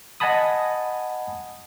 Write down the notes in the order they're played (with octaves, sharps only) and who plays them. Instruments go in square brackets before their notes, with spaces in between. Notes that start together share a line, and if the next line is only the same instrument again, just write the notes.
[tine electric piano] D#5 F#5 G#5 A5 B5 D#6